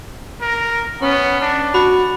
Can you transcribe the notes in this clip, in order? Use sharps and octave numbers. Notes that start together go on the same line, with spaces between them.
A#4
B3 C#4
D4
F#4 B5